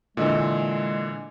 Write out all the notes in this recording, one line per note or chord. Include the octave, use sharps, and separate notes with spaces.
A#2 D3 E3 G#3